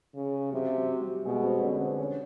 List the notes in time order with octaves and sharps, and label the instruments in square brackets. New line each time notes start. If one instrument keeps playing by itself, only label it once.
[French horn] C#3
[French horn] C3 [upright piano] F#3 F#4
[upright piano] F#3 F#4
G3 G4
[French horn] B2 [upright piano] G#3 G#4
[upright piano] C4 C5
[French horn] D3 [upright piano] C#4 C#5
[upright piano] B4
C4 C5
C#4 C#5